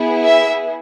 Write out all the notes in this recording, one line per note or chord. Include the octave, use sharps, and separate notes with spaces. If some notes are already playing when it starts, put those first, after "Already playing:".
Already playing: B3 E4 G#4
E5